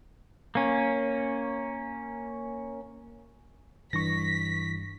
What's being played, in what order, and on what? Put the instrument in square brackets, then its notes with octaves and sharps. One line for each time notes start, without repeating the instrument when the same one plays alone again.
[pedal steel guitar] A#3 C#4
[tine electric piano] G2 [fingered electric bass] E3 [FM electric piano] C#6 A#6 [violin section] B6